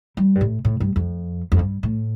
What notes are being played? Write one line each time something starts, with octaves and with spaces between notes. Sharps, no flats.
G3
G2
A2
A2
G2
F2
F2
G2
A2